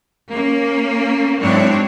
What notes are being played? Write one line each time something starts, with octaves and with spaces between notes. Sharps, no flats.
A#3 C#4
G#2 F#3 C4 D4 E4 C#5